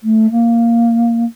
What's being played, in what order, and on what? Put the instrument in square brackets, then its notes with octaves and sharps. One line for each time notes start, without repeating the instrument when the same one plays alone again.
[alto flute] A3
A#3